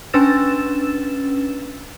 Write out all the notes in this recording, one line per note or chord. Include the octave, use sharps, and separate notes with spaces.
C#4 D4 B4 E6 A6 E7